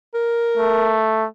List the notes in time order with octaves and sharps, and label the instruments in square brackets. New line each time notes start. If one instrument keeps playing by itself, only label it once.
[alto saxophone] A#4
[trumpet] A3